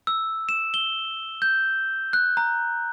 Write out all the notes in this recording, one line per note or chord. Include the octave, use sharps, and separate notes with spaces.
E6
E7
G7
G6
F#6
A#5